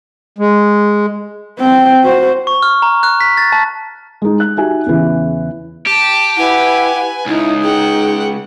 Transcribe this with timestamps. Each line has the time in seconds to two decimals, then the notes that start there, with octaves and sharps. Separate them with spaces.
0.39 G#3
1.59 C4 G5
2.03 F#4 C5
2.47 C#6
2.63 F6
2.82 A#5
3.03 F#6
3.21 B6
3.37 A6
3.52 A5
4.22 G#3 D#4
4.40 F#6
4.57 D#4 F#4 G4 E5 G#5
4.86 E2 C#3 E3
5.86 G4 A5
6.37 E4 B4 F#5 G#5
7.26 C#2 D#4 E4
7.62 G#4 F#5 G5